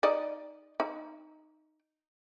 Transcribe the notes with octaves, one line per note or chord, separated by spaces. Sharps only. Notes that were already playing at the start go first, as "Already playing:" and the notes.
D#4 D5 D#5
D#4